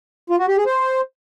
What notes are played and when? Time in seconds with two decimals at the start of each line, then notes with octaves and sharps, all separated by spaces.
0.30 F4
0.39 F#4
0.48 G4
0.57 G#4
0.66 C5